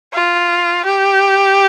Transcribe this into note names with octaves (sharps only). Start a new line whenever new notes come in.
F4
G4